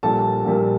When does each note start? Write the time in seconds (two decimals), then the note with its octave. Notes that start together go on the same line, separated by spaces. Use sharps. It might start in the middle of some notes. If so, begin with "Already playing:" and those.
0.03 A#1 A#2 G3 A#3 A4 A5
0.45 A#1 A#2 G3 A#3